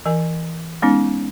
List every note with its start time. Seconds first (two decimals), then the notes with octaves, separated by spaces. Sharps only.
0.06 E3 A#4 G#5
0.82 G#3 B3 C#4 D#4